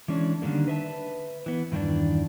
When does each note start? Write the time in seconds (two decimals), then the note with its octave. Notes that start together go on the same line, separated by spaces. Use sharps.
0.08 E3 G#3 C#4 D4
0.42 D3 D#3 G3 A#3
0.68 B4 E5 A5
1.46 E3 B3
1.72 E2 G2 D#3 E3 D4